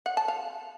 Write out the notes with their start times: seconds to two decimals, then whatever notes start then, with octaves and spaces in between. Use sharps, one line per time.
0.06 F#5
0.17 A5
0.28 F5